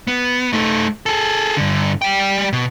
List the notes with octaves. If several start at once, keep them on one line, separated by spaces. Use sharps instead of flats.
B3
A3 D#4
G#4 A4
G2 D3
G3 G5
B2